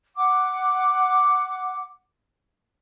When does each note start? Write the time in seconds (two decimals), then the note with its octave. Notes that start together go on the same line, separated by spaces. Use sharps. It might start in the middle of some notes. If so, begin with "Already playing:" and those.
0.16 F#5 D6